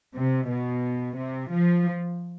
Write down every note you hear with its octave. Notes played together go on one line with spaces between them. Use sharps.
C3
B2
C3
F3